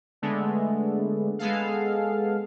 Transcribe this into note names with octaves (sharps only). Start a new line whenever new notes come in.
D3 G#3 A3 B3 D4
G#3 B3 G#4 A4 F5